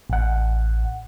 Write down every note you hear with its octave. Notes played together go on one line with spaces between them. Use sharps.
A1 F#5